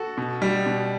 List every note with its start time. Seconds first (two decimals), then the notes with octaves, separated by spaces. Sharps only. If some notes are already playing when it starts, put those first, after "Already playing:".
Already playing: F#4 A4
0.17 B2
0.42 G3
0.66 B2